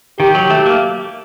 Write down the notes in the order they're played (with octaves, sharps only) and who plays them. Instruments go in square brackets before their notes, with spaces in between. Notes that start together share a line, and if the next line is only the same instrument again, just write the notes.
[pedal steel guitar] D#3 [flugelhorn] G4
[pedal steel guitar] F#3
A3
A#3